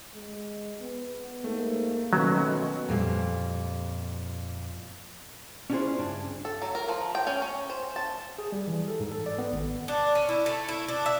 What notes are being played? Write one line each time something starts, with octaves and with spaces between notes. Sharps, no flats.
G#3
B3
G#2 A3 A#3
B2 D#3 F#3 A3 C#4 F#4
F2 A#2 G3
C#4 D4 E4 F4 G#4 C5
C#2 G2 D4
A4
F#3
A#4
F3
G5
C#4
C#4
C5
A5
G#4
G3
E3
A4
G#2
A4
D5
B3
G#1
D4
C#4
E4
A3
E4
D4
E5